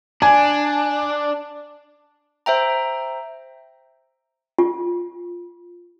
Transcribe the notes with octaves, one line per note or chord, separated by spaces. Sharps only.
D4 G#5
C5 E5 G5 A#5
F4